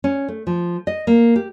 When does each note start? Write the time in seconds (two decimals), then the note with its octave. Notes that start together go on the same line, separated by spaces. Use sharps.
0.04 C#4
0.28 A3
0.47 F3
0.87 D#5
1.07 A#3
1.36 G4